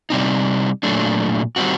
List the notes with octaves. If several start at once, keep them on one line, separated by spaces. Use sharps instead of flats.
C3 G3 C4 D#4
A#2 F#3 A3 D4
D#3 G3 C4 F#4